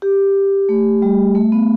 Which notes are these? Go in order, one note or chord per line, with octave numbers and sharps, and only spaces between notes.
G4
A3
G3
A3
B3